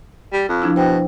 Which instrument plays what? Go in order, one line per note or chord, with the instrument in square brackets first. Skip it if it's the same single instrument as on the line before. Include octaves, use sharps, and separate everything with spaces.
[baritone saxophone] G3
F2
[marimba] F3 D4 E4
[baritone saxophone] B2 [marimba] C5 G5